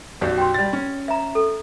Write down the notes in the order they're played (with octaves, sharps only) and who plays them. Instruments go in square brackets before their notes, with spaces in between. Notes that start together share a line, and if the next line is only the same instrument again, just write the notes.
[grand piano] B1 F#2 [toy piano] G4 C#5 D5
[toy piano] G5 C6
[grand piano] G3 A6
C#4
[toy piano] E5 A#5
A4